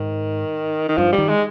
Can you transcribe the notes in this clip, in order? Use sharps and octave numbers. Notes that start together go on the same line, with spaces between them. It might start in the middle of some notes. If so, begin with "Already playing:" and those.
Already playing: G#2 D#3
D#3
G2 F3
G3
D#3
G#3